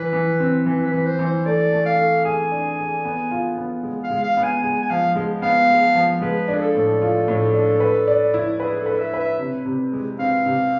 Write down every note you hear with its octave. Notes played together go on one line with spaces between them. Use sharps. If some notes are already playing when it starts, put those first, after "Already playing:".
Already playing: E3 B4
E3
C4
E3 B4
B4
E3
C5
E3
C5
A3 D5
A3
F5
A3
G#4 G#5
D4
G#4
B3
F4
B3
G#3
F5
G#3
F5
B3
G#5
G#3 G#5
G#5
F3 F5
G#3
B3 F5
G#3
F3
G#3 B4
D4
G#4
A4
A2
F4
A2
D4
B4
D5
E4
G#4 B4
A4
B4
E5
B4
E5
C3
C3
G#3
C4 F5
C3